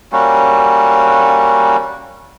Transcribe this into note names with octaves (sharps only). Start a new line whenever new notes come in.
G3 A#3 C#4 F#4